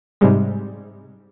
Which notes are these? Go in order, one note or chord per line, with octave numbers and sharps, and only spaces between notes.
G#2 C3 G3 G#3